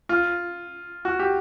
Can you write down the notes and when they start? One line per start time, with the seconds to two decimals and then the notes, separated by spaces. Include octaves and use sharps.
0.09 F4
1.05 F#4
1.19 G4